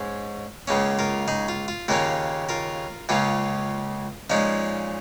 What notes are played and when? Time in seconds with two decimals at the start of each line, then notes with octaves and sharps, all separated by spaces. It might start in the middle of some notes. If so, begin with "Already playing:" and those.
Already playing: G#2 G#3 C#4
0.68 C#2 C#3 A#3 C#4
0.99 F4 A#4
1.28 D#4 G#4
1.48 F4
1.68 F4
1.88 D#2 C#3 A#3 C#4 F4 A#4
2.49 F4 A#4
3.09 C#2 C#3 A#3 C#4 F4
4.30 A#2 F3 G#3 C#4 D#4